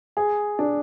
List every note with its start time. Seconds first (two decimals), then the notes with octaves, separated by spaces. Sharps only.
0.17 G#4
0.59 D4